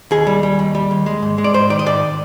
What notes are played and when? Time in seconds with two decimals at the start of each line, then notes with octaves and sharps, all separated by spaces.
0.11 D#2 G#4
0.27 G3
0.43 G3
0.59 D#2
0.75 G3
0.91 D#2
1.06 G#3
1.22 G#2
1.38 G#3
1.44 D5
1.53 G#2 C5
1.70 D#3 D5
1.79 D#5
1.86 G#2 D5